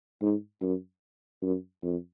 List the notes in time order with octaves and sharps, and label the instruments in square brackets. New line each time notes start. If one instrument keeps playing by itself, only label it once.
[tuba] G#2
F#2
F#2
F2